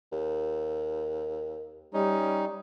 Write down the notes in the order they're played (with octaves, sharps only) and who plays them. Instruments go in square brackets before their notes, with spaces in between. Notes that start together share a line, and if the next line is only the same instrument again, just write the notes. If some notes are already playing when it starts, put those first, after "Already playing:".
[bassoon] D#2
[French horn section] G3 [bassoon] C#4 [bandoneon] D#4